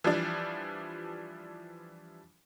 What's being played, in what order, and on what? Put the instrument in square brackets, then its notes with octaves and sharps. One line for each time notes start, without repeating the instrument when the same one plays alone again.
[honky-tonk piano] E3 F3 G3 D4